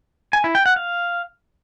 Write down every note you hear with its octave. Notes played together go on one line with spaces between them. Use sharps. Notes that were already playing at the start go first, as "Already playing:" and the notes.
G#5
E4
G5
F#5
F5